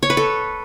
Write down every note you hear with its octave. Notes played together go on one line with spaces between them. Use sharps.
C#5
B4
A4